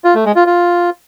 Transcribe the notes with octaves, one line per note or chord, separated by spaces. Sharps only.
F4
A3
G#3
F4
F4